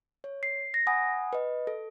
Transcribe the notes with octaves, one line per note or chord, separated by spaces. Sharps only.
C#5
C7
A#6
F#5 G#5 B5 D#6
B4 D#5
A4